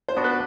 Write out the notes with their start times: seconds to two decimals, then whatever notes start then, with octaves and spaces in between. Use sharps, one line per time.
0.08 C5
0.17 B3 D4 F#4
0.24 B4